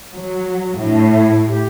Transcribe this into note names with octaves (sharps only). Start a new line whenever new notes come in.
F#3
A2 D4
E4
G4